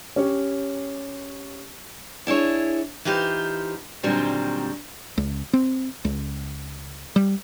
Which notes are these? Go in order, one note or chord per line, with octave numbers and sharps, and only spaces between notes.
C#4 G4 C#5
D4 E4 G#4 C#5
E3 D#4 F4 G4 C5
A#2 D3 D#3 F#3 G3 C4
C#2
C4
C#2
G3